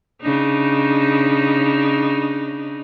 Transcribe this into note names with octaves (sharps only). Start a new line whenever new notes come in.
C#3 D4 D#4